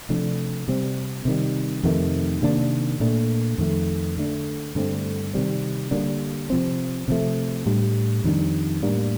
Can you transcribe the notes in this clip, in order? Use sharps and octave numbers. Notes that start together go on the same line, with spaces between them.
C3 F3 A3 D4
C3 G3 C4
C3 D#3 G3
F2 C3 D#3 A3
C3 D#3 A#3 D4
A#2 A3 D4
F2 D#3 A3
D3 A3 D4
G2 D3 A3 C4
C3 D#3 G3 C4
D3 G3 A#3 D4
C3 F3 C4
C3 F3 A3
A2 G3 D4
F2 D#3 G3 D4
A2 G3 A#3 D4